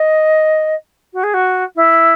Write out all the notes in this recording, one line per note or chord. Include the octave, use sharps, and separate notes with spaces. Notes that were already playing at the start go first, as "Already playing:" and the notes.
Already playing: D#5
F#4
G#4
F#4
E4